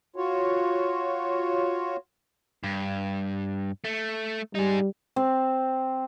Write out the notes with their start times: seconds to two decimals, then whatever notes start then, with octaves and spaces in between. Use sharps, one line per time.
0.16 F4 F#4 C#5
2.63 G2
3.84 A3
4.55 G3 D#4 G#4
5.16 C4